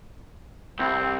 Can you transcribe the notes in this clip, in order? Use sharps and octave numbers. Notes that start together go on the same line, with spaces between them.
C2 C4